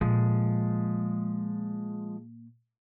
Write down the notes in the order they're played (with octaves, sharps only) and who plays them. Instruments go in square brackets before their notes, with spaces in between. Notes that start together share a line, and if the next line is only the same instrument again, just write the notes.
[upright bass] A#2 [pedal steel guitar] F3 G#3